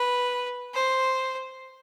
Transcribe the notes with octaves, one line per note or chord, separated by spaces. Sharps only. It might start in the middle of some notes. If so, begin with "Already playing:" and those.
Already playing: B4
C5